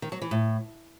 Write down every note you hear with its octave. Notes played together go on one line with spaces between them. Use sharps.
D#3
F#3
E3
A2